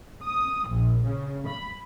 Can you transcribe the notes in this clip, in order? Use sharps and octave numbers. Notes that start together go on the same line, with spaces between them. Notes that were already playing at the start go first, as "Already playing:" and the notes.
D#6
A#1
C#3
B5